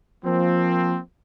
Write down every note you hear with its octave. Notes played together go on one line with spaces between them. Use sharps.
F3 A#3 C4